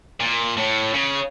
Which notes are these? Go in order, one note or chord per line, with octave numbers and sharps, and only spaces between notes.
A#2
A2
C#3